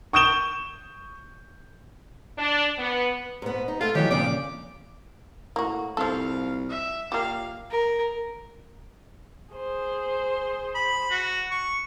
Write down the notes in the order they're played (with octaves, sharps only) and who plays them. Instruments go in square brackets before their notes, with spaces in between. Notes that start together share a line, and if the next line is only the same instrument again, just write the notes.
[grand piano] C#6 D#6 G6 D7 E7 G7
[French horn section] D4
B3
[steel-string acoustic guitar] G#2 B3
D#4
[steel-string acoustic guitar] A3 [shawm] F4 [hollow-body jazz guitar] F5
[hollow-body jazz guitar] D#3 E3 F#3 [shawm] G4 [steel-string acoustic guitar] C#5
[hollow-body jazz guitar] F2 A#2 C#3 [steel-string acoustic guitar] D4 D5 [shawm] D6
[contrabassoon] A2 [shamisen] A#3 F#4
[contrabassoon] C2 [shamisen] F3 A4 [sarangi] F5
[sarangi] E5
[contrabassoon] A#2 [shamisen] A#3 G4 [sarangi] F5
[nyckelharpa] A#4
[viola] G#4 C5
[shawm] B5
F#4
C#6